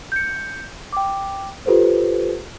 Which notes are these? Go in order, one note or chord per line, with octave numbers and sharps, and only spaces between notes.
G6 C#7
G5 D6
F4 G4 A4 B4 C5